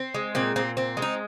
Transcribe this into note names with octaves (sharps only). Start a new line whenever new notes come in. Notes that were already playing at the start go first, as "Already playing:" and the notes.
Already playing: C4
G#3
A#2 C4
A#2 C4
C4
G#3
D#4